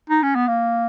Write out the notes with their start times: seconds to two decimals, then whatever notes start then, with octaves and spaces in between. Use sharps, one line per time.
0.10 D#4
0.23 C#4
0.35 B3
0.48 A#3